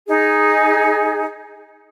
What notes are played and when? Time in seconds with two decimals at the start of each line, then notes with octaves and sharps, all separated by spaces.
0.08 D#4 G#4